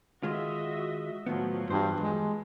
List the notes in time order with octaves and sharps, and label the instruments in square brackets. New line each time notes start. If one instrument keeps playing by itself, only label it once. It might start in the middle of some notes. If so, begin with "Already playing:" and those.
[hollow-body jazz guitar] D#3 G#3 F4 [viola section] F#4 D#5 E5
[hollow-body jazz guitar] A2 D#3 B3 [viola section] F3 F#3
[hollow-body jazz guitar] E2 C5 [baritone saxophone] G2
[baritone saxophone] G#3